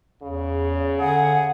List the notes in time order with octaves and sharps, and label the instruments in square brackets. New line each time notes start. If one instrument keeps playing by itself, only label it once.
[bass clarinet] E2 [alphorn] C#3
[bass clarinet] D3 [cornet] G#4 [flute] F#5